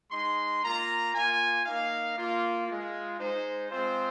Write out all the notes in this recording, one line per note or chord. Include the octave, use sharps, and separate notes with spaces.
G#3 D#4 C6
A#3 F4 A#5
A#3 F4 G#5
A#3 D#4 F5
A#3 F4
G#3 F4
G#3 D#4 C5
G#3 C4 F4 C5